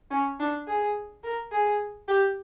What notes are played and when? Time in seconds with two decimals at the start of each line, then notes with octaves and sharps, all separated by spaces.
0.11 C#4
0.39 D4
0.67 G#4
1.23 A#4
1.52 G#4
2.08 G4